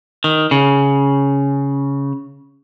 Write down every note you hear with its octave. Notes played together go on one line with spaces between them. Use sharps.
D#3
C#3